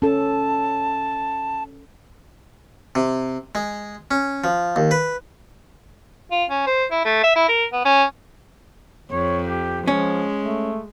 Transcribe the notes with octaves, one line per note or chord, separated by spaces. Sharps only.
C#4 A4 A5
C3
G#3
C#4
F3
D#2
B4
F4
C#4
C5
E4
A3
E5
E4
A#4
B3
C#4
F2 C#5
G4
F3 G#3 C#4
A3